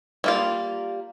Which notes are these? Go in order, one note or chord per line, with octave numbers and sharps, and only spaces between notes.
G3 A#3 F4